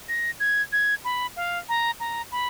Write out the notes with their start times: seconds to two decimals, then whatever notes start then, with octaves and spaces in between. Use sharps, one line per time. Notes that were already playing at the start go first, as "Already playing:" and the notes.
0.09 A#6
0.40 G#6
0.72 G#6
1.04 B5
1.36 F5
1.69 A#5
2.00 A#5
2.32 B5